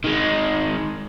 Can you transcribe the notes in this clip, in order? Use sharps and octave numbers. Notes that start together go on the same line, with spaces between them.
D#3 G#3